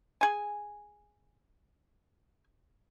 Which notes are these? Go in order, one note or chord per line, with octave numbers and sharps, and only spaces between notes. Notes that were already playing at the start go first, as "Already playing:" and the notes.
G#4 G#5